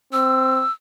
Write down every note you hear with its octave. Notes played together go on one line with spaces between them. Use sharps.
C4 E6